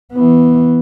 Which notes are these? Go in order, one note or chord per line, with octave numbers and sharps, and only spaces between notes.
E3 B3